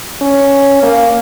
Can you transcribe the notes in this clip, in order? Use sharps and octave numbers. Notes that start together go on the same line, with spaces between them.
C#4
A#3